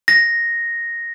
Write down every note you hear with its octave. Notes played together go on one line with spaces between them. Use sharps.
A#6